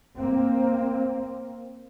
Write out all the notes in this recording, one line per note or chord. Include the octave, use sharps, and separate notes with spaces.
A#3 C4